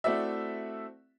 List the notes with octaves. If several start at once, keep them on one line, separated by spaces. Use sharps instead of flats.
A3 C4 E4 F#4 D5 E5